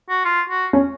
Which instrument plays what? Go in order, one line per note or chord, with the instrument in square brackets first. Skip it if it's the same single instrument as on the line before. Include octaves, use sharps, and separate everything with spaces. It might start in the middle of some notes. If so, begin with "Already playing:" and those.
[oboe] F#4
F4
F#4
[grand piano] C#4